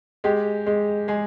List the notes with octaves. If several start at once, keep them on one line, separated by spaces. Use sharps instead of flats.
G#3 G4
G#3
G#3 G#4